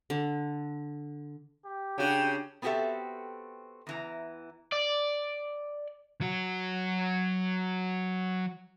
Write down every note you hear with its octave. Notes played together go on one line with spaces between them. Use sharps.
D3
G4
C#3 D4 F#4 G5
B3 C4 F#4 G4 A4 E5
E2 E3 A#5
D5
F#3 F#4